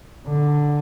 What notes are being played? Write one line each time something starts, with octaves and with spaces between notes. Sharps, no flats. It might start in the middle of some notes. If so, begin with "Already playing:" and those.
D3